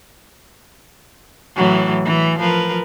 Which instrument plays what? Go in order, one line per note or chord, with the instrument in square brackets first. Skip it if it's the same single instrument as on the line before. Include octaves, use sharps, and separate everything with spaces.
[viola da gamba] A2 E3 F#3
E3
F3 A#4 B4